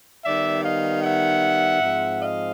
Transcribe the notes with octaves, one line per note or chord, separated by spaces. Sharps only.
D#3 G3 B3 D5 E5
D#5 F5
E5 F#5
G#2 F3 G#3 C4
D#5 F5